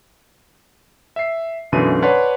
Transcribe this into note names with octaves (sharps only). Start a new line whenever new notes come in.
E5 C7
B1 F#2 B2 D3 E3 D#7
B4 C#5 D5 F#5 A5 C6